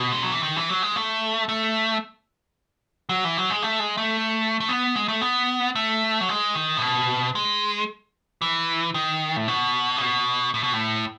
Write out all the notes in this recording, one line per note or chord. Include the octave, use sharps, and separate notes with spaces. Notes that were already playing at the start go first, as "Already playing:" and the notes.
Already playing: B2
G#3
F#3
E3
D#3
E3
F#3
G#3
A3
A3
F#3
E3
F#3
G#3
A3
G#3
A3
A3
B3
G#3
A3
B3
A3
F#3
G#3
D#3
A2
B2
G#3
E3
D#3
A2
B2
C#3
B2
A2
B2
A2